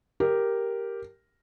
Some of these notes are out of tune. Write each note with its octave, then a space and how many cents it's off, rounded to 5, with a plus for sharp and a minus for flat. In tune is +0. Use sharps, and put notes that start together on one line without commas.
G4 +0 A#4 +0